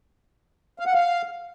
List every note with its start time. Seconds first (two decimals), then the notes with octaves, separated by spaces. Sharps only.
0.79 F5
0.87 F#5
0.94 F5